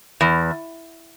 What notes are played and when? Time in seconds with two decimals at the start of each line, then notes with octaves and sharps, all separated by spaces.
0.21 E2